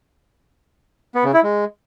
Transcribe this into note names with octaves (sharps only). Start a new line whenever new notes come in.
B3
C#3
E4
G#3